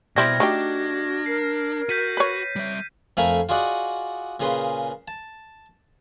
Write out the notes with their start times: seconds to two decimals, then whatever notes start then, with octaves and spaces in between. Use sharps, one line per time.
0.16 B2 G3 C4 E4 F6 G#6 A#6
0.40 A3 D4 D#4 F#4 G4
1.26 A#4 C7
1.89 F#4 G6 B6 D#7
2.17 B4 C#5
2.56 G3 E5
3.17 F2 A3 A#4 F5 G#5 B5
3.49 F4 F#4 G#4 D5 D#5 F#5
4.40 A#2 C#3 G#4 B4 C6
5.08 A5